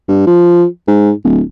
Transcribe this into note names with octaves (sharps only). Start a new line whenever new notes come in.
G2
F3
G#2
D1